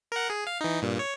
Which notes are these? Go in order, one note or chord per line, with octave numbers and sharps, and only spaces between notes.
A#4 F#5
G#4
F5
E3 D#4
G2 A#2
C#5